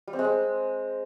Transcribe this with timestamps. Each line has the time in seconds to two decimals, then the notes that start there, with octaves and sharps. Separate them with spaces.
0.07 G3
0.13 C4
0.19 G#3
0.24 C4